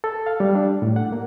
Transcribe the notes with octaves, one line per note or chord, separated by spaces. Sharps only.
A4
F5
G3
D4
A2
F#5
A#3